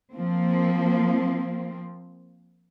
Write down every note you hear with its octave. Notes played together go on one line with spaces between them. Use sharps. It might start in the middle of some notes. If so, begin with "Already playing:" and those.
F3 A#3 C4